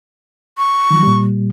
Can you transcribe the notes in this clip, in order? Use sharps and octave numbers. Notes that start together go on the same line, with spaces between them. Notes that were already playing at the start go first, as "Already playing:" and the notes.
C#6
D#3 F3 F#3
A#2 G3